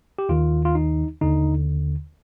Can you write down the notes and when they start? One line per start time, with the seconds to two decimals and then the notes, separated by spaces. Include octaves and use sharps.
0.19 G4
0.29 D#2 D#3 F4
0.65 F4
0.75 D#4
1.21 D#2 D3 D#4